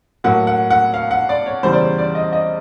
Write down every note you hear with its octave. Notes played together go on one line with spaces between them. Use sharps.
A2 F#3 A#3 F#5
F#5
F#5
F5
F#5
D5
C#5
E2 C#3 E3 G3 C5
D5
C#5
D5
D#5
D#5